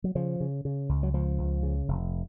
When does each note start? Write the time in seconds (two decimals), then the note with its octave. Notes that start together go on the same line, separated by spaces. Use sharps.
0.04 F#3
0.15 C#3 F3
0.40 C#3
0.65 C#3
0.89 C#2
1.03 F#3
1.14 C#2 F3
1.39 C#2
1.63 C#3
1.88 F1